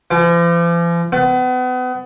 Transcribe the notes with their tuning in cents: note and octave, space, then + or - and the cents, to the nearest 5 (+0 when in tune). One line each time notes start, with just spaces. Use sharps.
F3 -45
B3 +35